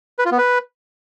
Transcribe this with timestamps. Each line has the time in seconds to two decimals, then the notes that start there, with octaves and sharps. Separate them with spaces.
0.19 B4
0.25 F4
0.32 B3
0.38 B4